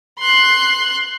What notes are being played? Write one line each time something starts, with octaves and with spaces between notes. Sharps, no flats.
C6 F#6